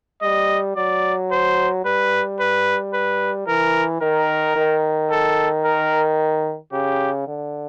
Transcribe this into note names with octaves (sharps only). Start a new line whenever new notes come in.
G3 D#5
F#3 D5
C5
G3 B4
B4
B4
E3 A#4
D#3 A#4
D#3
A4
A#4
C#3 G4
D3